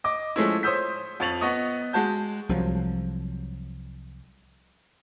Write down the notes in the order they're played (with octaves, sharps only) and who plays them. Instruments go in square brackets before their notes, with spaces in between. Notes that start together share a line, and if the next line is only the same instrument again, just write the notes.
[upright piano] D#5 D6
F3 G#3 A3 C#4 E4
C5 C#5 D#6 E6 G6 B6
F2 C#6 A6 F7 F#7
B3 D#5 C#6 D#6
G#3 F#4 A5 G6
[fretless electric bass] C2 F3 F#3